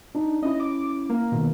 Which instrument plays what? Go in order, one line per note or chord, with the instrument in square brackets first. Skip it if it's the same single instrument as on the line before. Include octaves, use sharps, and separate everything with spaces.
[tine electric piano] D4 D#4
[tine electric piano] C#4 E4 [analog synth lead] D#5
[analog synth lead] D6
A#3
[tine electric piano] B2 D#3